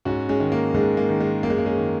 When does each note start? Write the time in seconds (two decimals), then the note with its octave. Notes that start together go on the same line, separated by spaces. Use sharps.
0.05 G#2 C#4 F#4
0.29 G#3 C#4
0.40 D#3
0.52 A#3
0.74 G#2 G#3
0.97 A#3
1.09 D#3
1.20 G#3
1.43 F#2 A#3
1.50 G#3
1.58 A#3
1.66 G#3 C#4
1.77 D#3